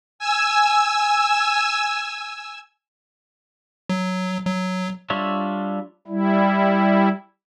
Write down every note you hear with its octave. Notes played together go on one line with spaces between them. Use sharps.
G#5 E6
F#3
F#3
G3 D4 F4 C#5 E5
G3 E4